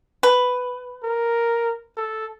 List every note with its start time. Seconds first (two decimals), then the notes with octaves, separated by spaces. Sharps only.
0.23 B4
1.04 A#4
1.97 A4